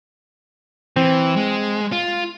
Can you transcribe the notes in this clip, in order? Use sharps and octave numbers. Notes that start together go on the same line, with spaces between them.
E3 C4
G#3
F4